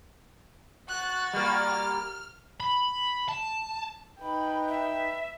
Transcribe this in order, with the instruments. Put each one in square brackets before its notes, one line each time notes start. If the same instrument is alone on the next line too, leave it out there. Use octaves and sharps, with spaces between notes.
[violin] F#4 A6 [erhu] F#6
[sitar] G3 A#3 [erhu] F6
[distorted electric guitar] B5
A5
[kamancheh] D#4 G5 [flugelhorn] B4 [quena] B5
[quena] E5